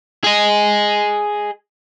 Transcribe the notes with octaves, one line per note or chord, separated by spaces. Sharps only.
G#4 D#5